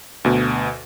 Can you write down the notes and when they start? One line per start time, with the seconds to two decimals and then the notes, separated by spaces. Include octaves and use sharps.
0.24 D2 B2